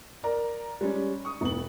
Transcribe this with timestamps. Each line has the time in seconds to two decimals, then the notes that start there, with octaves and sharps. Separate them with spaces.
0.23 A#4 D5 A#5
0.81 G3 G#3 C#4
1.25 C#6 D#6
1.41 E1 B3 F#7